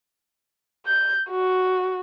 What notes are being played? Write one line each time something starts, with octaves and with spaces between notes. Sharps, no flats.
G6
F#4